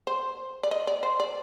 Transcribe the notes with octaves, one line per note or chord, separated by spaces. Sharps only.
C5
D5
D#5
D5
C5
D5